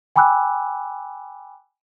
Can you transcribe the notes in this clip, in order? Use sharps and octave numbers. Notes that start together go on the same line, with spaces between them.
G5 G#5 B5 D6 E6 F#6